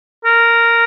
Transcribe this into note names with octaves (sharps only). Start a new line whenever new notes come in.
A#4